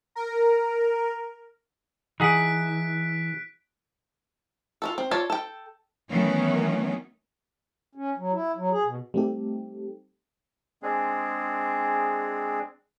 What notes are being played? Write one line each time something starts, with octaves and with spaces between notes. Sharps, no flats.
A#4
E3 D#4 G#4 F#5 F#6 B6 D7
F4 F#4 A4
C4
F4 A4 C#5 D5
A4 G5
D#3 E3 F#3 A3 B3 C#4
C#4
F#3
E4
F#3
G#4
B2
G3 A3 C4 D#4 G4 A4
G#3 C4 D4 G#4